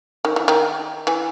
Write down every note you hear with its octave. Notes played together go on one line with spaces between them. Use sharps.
D#3
E3
D#3
E3